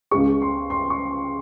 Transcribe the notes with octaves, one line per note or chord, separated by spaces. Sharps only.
C#2 C#3 G#3 C#6
C6
C6
C#6